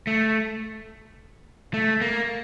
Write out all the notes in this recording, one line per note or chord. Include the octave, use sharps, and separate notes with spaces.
A3
A3
A#3